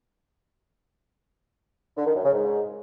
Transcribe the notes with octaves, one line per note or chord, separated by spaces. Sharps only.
D3
D#3
F#2
C#3
G#2